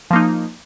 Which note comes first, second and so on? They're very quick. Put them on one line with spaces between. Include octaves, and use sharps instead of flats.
F3 A#3 D#4